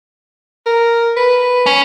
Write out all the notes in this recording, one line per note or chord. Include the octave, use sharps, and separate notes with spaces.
A#4
B4
C#4